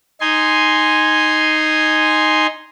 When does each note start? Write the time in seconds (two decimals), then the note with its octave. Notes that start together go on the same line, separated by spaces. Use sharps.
0.21 D#4 G#5 C6